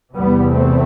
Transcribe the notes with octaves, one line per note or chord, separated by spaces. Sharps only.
E2 C3 G3 B3
A3 C4